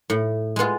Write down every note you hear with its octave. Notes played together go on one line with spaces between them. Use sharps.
A2
G#3 B3 F4